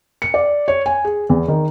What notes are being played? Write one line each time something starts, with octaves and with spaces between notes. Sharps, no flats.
C#7
D5
C#5
G#5
G#4
E2
D#3